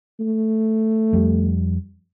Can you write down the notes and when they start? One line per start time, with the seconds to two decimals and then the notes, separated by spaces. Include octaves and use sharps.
0.20 A3
1.13 F2 G3